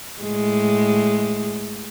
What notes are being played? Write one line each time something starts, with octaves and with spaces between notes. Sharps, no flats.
A2 G#3